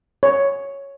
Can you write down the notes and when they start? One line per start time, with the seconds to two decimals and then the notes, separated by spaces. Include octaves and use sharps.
0.23 C#5